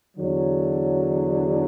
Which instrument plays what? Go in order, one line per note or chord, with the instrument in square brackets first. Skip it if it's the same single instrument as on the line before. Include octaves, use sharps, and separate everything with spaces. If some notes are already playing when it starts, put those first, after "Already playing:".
[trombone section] E2 D3 F#3